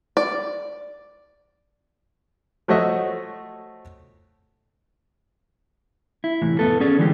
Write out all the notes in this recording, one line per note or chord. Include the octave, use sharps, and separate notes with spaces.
D5
F3 A3 F#4 C#5 D#5 E5
E4
C2 A2 E3
F2 B3 A4
C#4 G#4 D5
D3 E3 G3 G#3 F4 G4